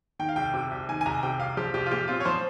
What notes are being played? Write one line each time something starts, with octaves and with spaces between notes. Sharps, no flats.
D#3 G5
F5
C2 G5
C3
C2
D#3 G#5
G#5
C2 A#5
C3 G5
C2 F5
F3 G4
C2 G4
F4
A#2 G4
C4 F4
C#5
F3 C5